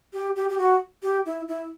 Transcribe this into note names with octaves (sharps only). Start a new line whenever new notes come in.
G4
G4
G4
F#4
G4
E4
E4